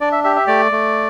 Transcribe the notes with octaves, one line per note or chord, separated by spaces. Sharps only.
D4 D5
E5
G4 E5
E5
A3 D5
A3